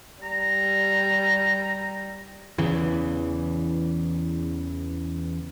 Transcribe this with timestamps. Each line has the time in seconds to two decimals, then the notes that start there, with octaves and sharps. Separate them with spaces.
0.23 G3 A#5
2.58 E2 C#3 E3